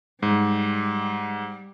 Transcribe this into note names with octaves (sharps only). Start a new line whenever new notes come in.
G#2 G3